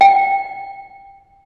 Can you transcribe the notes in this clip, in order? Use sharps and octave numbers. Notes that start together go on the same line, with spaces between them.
G5